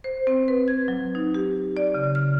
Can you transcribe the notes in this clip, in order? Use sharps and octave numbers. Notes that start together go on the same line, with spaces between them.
C5
C4
B4
G#6
F#3
D#4
G4
D5
C#3
F6